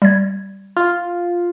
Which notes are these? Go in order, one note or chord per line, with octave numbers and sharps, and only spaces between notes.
G3 G#6
F4